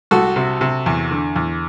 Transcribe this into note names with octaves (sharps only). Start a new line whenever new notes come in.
C2 F#4 A4
C3
C3
E2
D3
E2